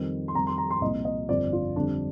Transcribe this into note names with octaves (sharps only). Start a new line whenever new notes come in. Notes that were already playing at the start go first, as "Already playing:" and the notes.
Already playing: F2 D#3 G3
C6
F2 D#3 G3 A#5
C6
A#5
C6
C2 A#2 F3 D#5
D#5
G1 F2 D3 F3 D5
F4
F2 D3 G3 D4